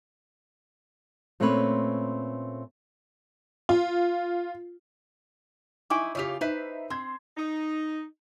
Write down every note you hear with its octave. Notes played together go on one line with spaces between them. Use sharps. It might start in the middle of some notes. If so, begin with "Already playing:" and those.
A#2 A3 C4 C#4 B4 C#5
F4
D#4 E4 G#5 C#6 D6
C#3 F4 G4 C#5 F7
D#4 B4 C5 E5 B6
C4 C6 G#6
D#4